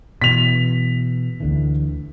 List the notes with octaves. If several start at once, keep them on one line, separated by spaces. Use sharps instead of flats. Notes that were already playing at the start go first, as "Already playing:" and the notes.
B2 E3 B6 F7
D2 D3 E3